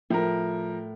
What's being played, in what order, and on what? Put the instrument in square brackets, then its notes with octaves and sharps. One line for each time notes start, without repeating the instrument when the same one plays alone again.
[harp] A2 [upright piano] F3 A#4